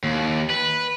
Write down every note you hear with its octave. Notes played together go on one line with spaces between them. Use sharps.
D#2
B4